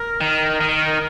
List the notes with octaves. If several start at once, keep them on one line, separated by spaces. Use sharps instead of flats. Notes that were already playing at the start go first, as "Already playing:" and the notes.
Already playing: A#4
D#3
D#3